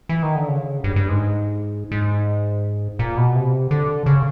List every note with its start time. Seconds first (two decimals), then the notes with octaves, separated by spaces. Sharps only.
0.09 E3
0.23 D#3
0.35 D3
0.48 C#3
0.84 G2
0.96 G2
1.09 G#2
1.92 G#2
2.99 A#2
3.17 B2
3.35 C3
3.71 D3
4.06 C#3